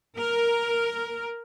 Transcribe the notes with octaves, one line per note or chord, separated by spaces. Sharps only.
A#4